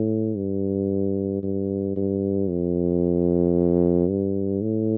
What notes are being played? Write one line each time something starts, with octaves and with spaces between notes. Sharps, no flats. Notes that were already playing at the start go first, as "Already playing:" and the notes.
Already playing: A2
G2
G2
G2
F2
G2
A2